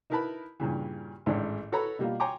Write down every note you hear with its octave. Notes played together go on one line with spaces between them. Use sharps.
D#4 E4 A#4 B4 A5 B5
G2 A#2 C#3 E3
A1 G#2 D#3 G#3 C#4 D4
F#4 A4 B4 C#5 A#5 B5
B2 G3 A#3 F4
C#5 G5 G#5 A#5 C6 D6